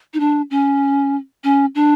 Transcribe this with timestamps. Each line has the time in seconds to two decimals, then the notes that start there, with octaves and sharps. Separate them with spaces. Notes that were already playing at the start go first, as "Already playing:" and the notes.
0.14 D#4
0.20 D4
0.51 C#4
1.44 C#4
1.75 D4